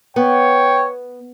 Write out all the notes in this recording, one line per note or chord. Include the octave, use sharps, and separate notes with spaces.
B3 C#5 G5